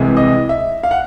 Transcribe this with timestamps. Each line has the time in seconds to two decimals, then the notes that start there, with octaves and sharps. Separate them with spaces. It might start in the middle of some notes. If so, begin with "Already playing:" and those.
Already playing: C2 C3 E3 G#3
0.17 D#5
0.49 E5
0.83 F5
0.91 F#5